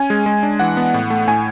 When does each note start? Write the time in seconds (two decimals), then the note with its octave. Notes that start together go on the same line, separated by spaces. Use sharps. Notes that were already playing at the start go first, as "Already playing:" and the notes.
Already playing: C#4 G#5
0.10 G#3
0.26 G#3
0.43 D4
0.60 E3 F#5
0.77 B3
0.94 A2
1.10 A3
1.28 A2 G#5